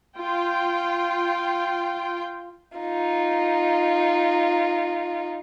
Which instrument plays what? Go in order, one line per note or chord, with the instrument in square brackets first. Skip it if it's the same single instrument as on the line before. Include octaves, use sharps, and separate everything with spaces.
[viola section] F4 G5
[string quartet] D#4 F4